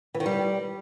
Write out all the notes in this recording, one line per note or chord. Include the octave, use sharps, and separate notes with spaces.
E3
D#3
G3